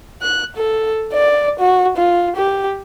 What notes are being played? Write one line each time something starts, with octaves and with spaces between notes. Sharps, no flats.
F#6
A4
D5
F#4
F4
G4